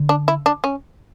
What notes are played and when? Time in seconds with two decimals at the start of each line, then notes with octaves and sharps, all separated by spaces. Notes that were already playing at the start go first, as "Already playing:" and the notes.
Already playing: D3
0.09 D4
0.28 E4
0.46 D4
0.64 C#4